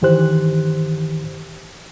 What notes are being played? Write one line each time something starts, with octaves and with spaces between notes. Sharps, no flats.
G2 D#3 E3 G4 C5 F#6